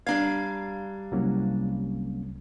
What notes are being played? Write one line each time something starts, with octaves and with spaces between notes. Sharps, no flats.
G3 D4 F5 A#5 G#6
C2 F#3 A#3 C#4